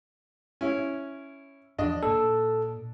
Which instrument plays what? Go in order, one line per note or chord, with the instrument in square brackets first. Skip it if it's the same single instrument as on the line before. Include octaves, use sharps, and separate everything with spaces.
[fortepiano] C#4 E4
[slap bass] E2 F3 [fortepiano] D4 D#5
[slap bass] A#2 A#3 [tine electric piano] A4